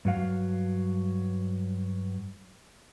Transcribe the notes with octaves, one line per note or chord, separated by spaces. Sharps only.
G2 F#3 F5